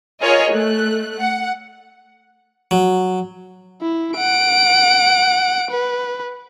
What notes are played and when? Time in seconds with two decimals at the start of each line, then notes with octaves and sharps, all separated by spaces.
0.22 F4 G#4 A#4 C#5 D#5
0.53 A3 F#6
1.19 F#5
2.71 F#3
3.81 E4
4.17 F#5 D7
5.70 B4